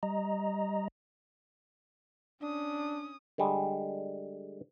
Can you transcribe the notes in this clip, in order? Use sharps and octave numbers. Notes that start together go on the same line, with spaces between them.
G3 D#5 A#5
C#4 D4 D#6
D3 G3 G#3